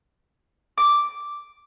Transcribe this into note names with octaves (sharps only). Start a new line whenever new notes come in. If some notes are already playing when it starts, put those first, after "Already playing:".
D6